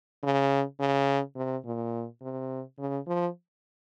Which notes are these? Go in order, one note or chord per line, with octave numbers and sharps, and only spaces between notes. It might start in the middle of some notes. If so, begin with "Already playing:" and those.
C#3
C#3
C3
A#2
C3
C#3
F3